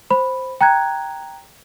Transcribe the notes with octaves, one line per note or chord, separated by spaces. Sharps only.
C5 B5
G5 A#5 F#6 G#6